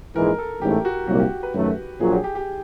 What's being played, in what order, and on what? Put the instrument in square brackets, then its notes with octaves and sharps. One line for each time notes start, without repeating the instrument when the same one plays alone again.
[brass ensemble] A#1 G#2 E3 G#3 [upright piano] A#4
[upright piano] A4
[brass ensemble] A1 G#2 E3 A3 [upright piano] G4
[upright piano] F#4
[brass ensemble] C2 A#2 F#3 A#3 [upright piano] F#4
[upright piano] G4
B4
[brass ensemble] F#2 D#3 F#3 A3
[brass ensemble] A#1 A#2 F#3 [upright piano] G#4
[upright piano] G4
G4
G4